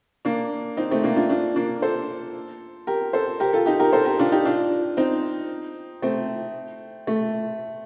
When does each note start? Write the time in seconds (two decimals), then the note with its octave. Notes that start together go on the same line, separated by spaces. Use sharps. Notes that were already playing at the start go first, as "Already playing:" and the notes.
0.25 A#3 D4
0.77 C4 D#4
0.91 A3 C4
1.03 A#3 D4
1.16 D4 F4
1.30 D4 F4
1.56 A#3 D4
1.82 A4 C5
2.87 G4 A#4
3.13 A4 C5
3.40 G4 A#4
3.53 F4 A4
3.66 D#4 G4
3.80 G4 A#4
3.93 A4 C5
4.05 G4 A#4
4.19 D4 F4
4.32 D#4 G4
4.45 D4 F4
4.97 C4 D#4
6.02 A3 C4
7.07 A3